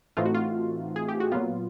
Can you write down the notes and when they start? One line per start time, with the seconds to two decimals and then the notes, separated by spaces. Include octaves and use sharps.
0.17 A2 E3 A3 C4 D#4 F4
0.25 F#4
0.34 F4
0.96 G#4
1.08 G4
1.20 F#4
1.32 A#2 F#3 B3 F4